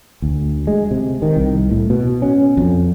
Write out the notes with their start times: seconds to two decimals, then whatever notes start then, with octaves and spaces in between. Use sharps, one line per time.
0.22 D2
0.67 G#3
0.91 C3
1.22 D#3
1.37 C2
1.71 A2
1.90 B2
2.22 C#4
2.57 F2